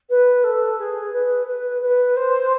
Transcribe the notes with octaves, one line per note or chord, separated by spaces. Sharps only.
B4
A4
G#4
B4
B4
B4
C5